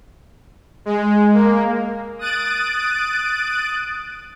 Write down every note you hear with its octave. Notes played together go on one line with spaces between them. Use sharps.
G#3
A#3
D#6 F#6 A6 D7 D#7